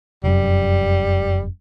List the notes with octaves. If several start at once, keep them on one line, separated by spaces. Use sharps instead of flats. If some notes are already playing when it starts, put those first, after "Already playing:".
F1 F#2 G3